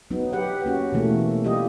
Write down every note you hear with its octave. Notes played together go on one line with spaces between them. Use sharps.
F#3 B3 D#4
G4 B4 F#5
A#3 C#4 F#4
B2 E3 A3 A#3
G3 A#3 F4 G4 D#5